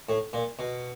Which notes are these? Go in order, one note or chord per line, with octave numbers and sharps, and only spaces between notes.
A2
A#2
B2